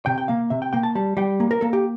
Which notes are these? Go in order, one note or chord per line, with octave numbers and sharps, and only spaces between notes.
C3 G5
G5
A#3 F5
C3 E5
G5
A#3 G5
A5
G3 A5
G3 G5
A#3
A#4
A#3 A4
G4